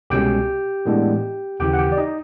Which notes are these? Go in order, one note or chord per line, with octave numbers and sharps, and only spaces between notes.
C2 B2 G#3 C#4 G4 G5
A2 E3 G#3 B3 D4
D#2 C#3 E3 G4 G5
F#5
G4 G5
D5
D#4 D#5